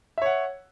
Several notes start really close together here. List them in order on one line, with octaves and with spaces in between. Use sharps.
E5 C#5 F#5